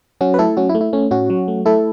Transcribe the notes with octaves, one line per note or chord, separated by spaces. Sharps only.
F#3 C#4 F#4
B4
A3 E4 A4
F#3 C#4 F#4
E4
A3
E4
A3 C#4
A2 C#4 F#4
F#3
A3
A3 E4 A4